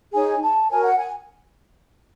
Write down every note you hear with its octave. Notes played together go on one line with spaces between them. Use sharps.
D#4 G#4 C#5 G#5
A5
F#4 A#4 C#5 G#5
F#5
G#5